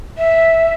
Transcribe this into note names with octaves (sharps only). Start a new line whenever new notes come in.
E5